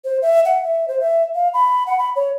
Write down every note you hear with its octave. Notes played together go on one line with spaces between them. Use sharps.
C5
E5
F#5
E5
C5
E5
F5
B5
F#5
B5
C#5